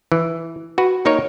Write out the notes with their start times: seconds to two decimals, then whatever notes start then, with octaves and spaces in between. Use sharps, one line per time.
0.12 E3
0.78 F#4 B4
1.05 A#3 D#4 A#4 C#5